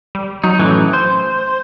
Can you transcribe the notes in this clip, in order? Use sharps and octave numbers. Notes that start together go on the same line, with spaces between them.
G3
F#3 D#4
F#2 A2 E3
C5